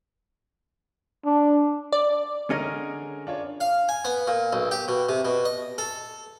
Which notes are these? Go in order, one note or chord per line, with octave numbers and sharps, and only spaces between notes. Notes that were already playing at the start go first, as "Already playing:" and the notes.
D4
D5
D3 C#4 G#4 A#4 D#5 F6
D4 F4 C#5
F5
G#5
B3
A#2
B1
G4
B2
C3
B2
D#5
A4